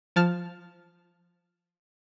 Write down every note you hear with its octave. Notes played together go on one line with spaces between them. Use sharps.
F3 A5 F6